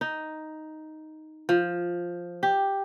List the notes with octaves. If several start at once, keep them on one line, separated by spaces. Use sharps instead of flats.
D#4
F3
G4